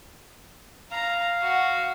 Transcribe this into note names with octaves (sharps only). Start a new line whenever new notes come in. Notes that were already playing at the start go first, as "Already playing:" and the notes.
F5 A#5
F#4